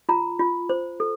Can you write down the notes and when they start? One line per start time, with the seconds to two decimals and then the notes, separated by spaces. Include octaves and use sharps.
0.09 F4 A#5
0.39 F4
0.70 C5
1.00 A4